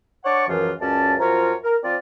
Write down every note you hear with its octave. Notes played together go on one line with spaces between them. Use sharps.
D4 C#5 D5 F#5 C#6 D6
C#2 F#2 E3 F3 F4 A#4
C#2 F#2 C#4 D5 A5
F#2 F3 F4 A#4 C#5 A#5
A#4
F3 C4 F4 D5